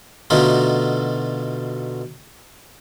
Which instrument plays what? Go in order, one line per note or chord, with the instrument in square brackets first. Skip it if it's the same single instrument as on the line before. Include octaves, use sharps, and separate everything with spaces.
[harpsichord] B2 D3 A3 D#4 F4 F#4